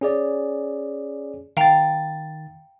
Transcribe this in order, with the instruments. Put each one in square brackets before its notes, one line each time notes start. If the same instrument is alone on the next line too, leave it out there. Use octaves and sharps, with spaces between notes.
[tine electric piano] C#4 G#4 D5
[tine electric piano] D#3 A6 [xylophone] F5 G5 A#5